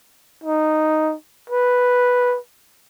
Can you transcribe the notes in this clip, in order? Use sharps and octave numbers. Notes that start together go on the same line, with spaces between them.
D#4
B4